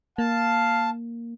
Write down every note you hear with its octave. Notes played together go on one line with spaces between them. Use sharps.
A#3 F5 A5